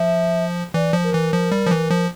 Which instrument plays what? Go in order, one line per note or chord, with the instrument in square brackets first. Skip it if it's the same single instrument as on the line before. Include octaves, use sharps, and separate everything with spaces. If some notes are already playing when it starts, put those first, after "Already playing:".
Already playing: [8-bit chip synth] F3 [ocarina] E5
[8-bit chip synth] E3 [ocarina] D5
[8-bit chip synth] F3
[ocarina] A#4
[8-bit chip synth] E3
F3
G3
F3
E3
F3